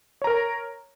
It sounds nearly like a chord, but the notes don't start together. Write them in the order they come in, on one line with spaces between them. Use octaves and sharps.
C#5 A#5 A#4